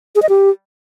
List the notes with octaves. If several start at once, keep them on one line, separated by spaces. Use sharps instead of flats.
G#4
D#5
G4